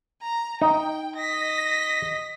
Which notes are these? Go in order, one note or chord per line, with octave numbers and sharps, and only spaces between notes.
A#5
D#4 G5
D#5 A#6 B6